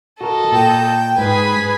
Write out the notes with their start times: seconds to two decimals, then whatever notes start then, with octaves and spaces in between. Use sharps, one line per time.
0.21 F#4 A4 A#4 D#5
0.52 A#2 G5
1.18 G#2 G#4 B4 G#5 B6